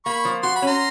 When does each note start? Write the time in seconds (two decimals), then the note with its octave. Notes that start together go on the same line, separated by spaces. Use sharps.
0.05 A#3 B5 C#6
0.25 F3
0.43 F#4 C6
0.56 B5
0.62 C#4 A#5 C6